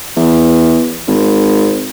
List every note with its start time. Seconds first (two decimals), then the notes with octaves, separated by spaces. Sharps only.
0.16 E2
1.08 G#1